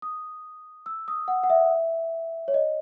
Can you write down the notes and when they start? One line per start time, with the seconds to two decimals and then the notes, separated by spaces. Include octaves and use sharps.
0.02 D#6
0.86 E6
1.08 D#6
1.28 F#5
1.43 F#5
1.50 E5
2.48 C#5
2.54 D#5